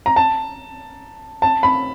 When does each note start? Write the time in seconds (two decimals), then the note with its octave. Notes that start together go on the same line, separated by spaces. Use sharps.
0.06 A#5
0.16 A5
1.42 A5
1.63 B5